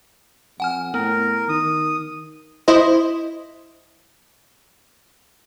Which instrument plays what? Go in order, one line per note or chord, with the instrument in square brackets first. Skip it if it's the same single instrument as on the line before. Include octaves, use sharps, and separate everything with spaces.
[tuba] F2 [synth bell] F#5 G#5 F6
[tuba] A2 [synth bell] B3 [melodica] A#4
[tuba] D#3 [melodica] D#6
[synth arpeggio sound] E4 C5 D#5